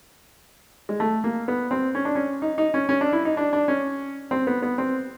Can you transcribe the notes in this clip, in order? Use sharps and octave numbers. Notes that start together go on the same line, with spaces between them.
G#3
A3
A#3
B3
C4
C#4
D4
C#4
D#4
D#4
C#4
C#4
D4
E4
D#4
D4
D4
C#4
C4
B3
B3
C4